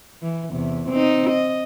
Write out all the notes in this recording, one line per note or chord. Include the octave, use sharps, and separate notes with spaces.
E3
E2 C3
C4 D#4
D#5